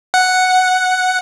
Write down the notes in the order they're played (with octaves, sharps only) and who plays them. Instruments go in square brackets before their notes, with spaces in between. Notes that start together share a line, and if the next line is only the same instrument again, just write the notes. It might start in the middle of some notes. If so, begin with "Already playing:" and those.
[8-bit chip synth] F#5